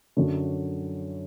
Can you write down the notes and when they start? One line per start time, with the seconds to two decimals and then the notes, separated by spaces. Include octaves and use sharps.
0.17 F#2 D3 F#3